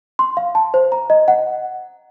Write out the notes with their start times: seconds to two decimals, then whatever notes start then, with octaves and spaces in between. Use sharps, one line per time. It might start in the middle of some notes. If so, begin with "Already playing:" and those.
0.19 C6
0.37 F5
0.55 A5
0.74 C5
0.92 A#5
1.10 D#5
1.28 F#5